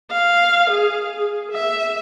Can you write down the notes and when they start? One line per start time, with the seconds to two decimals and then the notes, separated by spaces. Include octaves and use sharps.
0.11 F5
0.70 G#4
1.15 G#4
1.52 E5